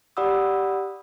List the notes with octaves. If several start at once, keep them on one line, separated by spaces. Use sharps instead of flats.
G4 D5 F#5 B5 D#6 E6